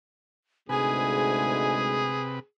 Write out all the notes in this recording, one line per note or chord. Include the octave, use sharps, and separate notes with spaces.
D2 G#2 C3 G#3 G#4 B4 G#5